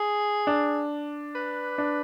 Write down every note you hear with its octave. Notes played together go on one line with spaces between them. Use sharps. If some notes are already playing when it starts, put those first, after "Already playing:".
Already playing: G#4
D4
B4
D4